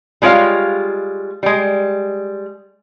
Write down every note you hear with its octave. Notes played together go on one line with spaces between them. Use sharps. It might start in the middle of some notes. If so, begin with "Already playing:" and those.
G3 G#3 F4 C#5 F5
G3 G#3